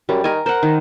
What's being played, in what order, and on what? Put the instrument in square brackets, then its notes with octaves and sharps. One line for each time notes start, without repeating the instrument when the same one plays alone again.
[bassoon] F#2 [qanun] G3
[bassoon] D#3 [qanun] A#4 G#5
[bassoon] A#4 [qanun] C5 F#5
[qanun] D#3